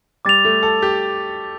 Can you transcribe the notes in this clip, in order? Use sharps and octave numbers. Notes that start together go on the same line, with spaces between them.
G3 D6 A6 F7
A3
A4
G4